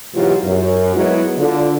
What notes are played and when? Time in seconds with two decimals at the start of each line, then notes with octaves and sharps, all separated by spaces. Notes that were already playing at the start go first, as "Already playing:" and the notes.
0.15 G#2 B2 E3 F#3 F4 G4
0.44 F#2
0.96 F#3 G#3 B3 E4
1.38 D3 F4